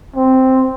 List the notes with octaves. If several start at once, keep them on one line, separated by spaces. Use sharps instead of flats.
C4